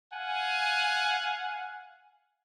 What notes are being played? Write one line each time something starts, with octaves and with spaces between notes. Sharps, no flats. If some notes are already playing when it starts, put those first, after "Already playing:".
F5 F#5 G#5